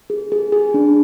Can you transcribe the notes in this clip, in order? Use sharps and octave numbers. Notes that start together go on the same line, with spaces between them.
G#4
G#4
G#4
D4